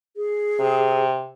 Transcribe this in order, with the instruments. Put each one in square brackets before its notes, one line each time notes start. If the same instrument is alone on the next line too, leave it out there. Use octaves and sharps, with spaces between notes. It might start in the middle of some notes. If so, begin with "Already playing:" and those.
[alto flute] G#4
[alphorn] C3